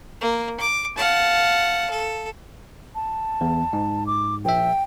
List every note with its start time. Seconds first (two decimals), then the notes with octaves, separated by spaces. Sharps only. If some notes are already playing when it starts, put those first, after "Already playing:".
0.21 A#3
0.60 D6
0.97 F5 F#5 A5
1.90 A4
2.95 A5
3.41 E2
3.73 G#2
4.07 D6
4.45 A#1 E5 G5